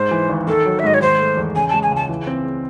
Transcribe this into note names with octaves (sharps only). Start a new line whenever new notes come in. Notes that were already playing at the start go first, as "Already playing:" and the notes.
Already playing: G#2 C5
E3
G#1
D#3 A4
F#3
E5
G#2 D#5
C#5
D#3 C5
A3
E2
C#3 G#5
G#3 A5
G#5
C#2 A5
E3
C4